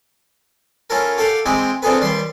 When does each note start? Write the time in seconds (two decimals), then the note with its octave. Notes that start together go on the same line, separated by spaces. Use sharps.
0.90 C#4 E4 F4 A4 A#4
1.18 G4 A4 F5 F#5
1.46 G#3 C4 D#4 E4 G4 G#4
1.82 C4 D4 F4 G#4 A4 B4
2.01 D#2 G3 B4 C6